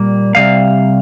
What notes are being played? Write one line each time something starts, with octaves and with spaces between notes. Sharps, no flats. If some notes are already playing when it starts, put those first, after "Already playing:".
Already playing: A#2 G3 A#3
C3 G3 F5